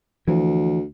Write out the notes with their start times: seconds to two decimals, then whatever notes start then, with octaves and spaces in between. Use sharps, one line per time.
0.28 D2 E3 F3